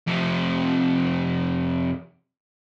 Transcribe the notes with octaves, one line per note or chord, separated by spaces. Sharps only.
F2 C3